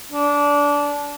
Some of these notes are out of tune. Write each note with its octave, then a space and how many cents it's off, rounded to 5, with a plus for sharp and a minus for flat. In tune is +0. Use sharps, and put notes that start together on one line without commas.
D4 -20